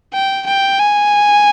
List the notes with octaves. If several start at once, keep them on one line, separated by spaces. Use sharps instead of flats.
G5
G5
G#5